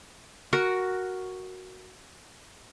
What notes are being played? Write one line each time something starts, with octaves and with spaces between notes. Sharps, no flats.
F#4 A#4